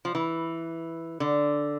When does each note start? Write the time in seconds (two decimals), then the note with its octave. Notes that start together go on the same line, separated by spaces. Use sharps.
0.05 F3
0.15 E3
1.20 D3